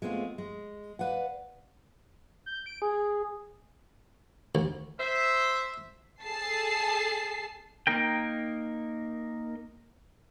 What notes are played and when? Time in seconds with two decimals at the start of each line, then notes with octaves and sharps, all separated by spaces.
0.02 G#3 A3 B3 C4 F4
0.38 G#3
0.99 B4 D5 F5 F#5
2.46 G6
2.66 D7
2.82 G#4
4.55 D2
4.99 C5 E5
6.24 G#4 A4 A5 C7
7.87 A#3 D#4 A#4 G5